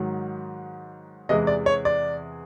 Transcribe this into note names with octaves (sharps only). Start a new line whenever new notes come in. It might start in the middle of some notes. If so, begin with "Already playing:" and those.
Already playing: G#2 D#3 F#3
E2 C3 E3 G#3 D#5
D5
C#5
D5